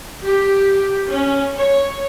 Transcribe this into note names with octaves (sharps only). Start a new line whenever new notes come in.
G4
C#4
C#5